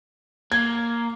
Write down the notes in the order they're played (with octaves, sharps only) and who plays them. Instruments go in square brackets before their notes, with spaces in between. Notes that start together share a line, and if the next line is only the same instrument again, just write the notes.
[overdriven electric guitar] A#3 [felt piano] G#6